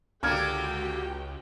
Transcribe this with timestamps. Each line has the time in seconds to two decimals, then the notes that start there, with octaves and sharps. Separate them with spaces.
0.23 C#2 D3 A#3 F#4 G4 G5 F6 G#6